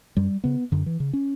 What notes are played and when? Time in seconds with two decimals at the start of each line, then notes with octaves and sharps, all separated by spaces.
0.17 F#2 G3
0.44 C#3 B3
0.72 F#2 D3
0.86 E3
1.00 C#3
1.13 C#4